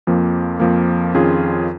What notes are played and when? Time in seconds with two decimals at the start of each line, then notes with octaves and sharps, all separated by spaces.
0.07 F2 F3 A#3
0.60 F2 F3 A#3
1.14 F2 D#3 C#4 F4 G#4